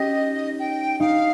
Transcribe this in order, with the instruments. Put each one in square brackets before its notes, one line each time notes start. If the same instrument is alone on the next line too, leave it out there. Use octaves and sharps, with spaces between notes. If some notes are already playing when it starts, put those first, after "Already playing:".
Already playing: [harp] C#4 D#4 G4 [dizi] D#5
[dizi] G5
[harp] D#4 [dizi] F5